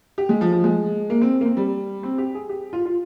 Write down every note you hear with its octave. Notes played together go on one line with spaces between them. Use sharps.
G4
G#3
F3
F3
G#3
A#3
C4
A#3
C4
G3
C4
G4
G#4
G4
F4
F4